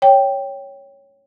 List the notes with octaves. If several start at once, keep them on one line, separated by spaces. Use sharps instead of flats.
C#5 G5